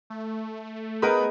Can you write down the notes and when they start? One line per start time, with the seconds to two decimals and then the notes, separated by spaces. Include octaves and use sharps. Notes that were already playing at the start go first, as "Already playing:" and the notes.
0.10 A3
1.02 B3 D#4 G#4 A#4 B4 B5